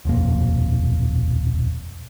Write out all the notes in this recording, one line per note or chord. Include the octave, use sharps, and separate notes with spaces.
D#1 B1 F2 A#3